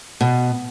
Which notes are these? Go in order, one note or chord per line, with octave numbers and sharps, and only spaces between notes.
B2